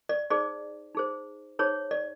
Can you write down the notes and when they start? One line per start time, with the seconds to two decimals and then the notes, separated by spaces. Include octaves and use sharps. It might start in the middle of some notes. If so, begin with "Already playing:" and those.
0.09 D5
0.30 D#4 G#4 C5 D5
0.95 D#4 G#4 C5
1.59 D#4 G#4 C5 C#5
1.91 D5